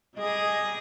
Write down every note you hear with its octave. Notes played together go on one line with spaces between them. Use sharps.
G3 G#4 D#5